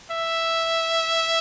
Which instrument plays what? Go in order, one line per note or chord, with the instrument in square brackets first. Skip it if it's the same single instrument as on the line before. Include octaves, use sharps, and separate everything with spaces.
[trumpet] E5